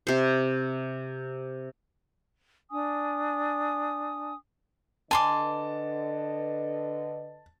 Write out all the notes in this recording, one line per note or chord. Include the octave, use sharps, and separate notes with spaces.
C3 C5
D4 G#5 D#6
D3 B4 D#5 G#5 A5 C6 D6